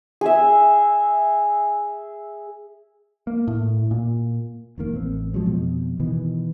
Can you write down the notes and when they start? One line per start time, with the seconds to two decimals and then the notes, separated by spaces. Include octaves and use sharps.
0.21 G#4 E5
3.27 A#3
3.47 A2
3.91 A#2
4.78 F1 D#3 A#3
4.92 A1 C4
5.34 C3 F3 F#3 G#3
5.46 F2 B2
6.00 B2 D#3 E3 B3